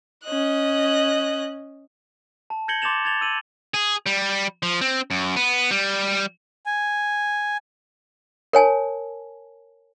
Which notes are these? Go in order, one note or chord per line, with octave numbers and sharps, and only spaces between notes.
C#4 D#5 F#6
A5
G6 G#6 A#6 C#7 F#7 G7
C6 D6 G6 A6 E7 F7
G#6 A6 F7 G7
E6 D#7 F#7
G#4
G3
F3
C4
F#2
B3
G3
G#5
A#4 C#5 G#5 A5